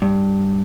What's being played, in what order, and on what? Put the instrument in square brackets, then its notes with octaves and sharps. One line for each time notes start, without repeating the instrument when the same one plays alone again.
[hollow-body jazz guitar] G2